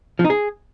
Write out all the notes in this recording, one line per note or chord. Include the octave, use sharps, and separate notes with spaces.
F3
D#4
G#4